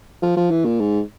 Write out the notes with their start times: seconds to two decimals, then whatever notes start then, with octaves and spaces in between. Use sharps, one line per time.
0.22 F3
0.37 F3
0.51 E3
0.65 A#2
0.80 G#2